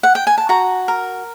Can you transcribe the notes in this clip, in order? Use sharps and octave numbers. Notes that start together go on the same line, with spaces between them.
F#5
G5
G#5
A5
F#4 A#5
A#4